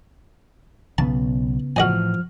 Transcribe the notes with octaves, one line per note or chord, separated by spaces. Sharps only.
B1 C#3 B3 A5
A2 E3 F3 F#4 D#5 G#5 F6